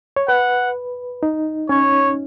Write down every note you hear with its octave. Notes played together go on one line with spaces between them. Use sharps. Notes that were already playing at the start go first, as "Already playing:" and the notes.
C#5
B4 F#5
D#4
C#4 C#5